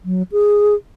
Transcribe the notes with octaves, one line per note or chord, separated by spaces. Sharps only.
F#3
G#4